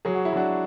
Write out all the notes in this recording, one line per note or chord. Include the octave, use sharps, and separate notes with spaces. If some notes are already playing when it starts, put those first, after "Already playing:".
F#3 G#4
F#4
E4
F#3 D4 F#4